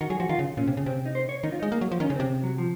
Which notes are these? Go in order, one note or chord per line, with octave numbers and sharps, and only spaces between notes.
D#3 F#4
F#3 G#4
F3 F#4
D#3 F4
C#3
A#2 C#4
C3
C#3
C3 C4
D#4
C5
C#5
D#3 D#4
F4
G#3 D#4
A#3
F#3
F3
D#3 C#4
C#3
C4
C3
F#3
F3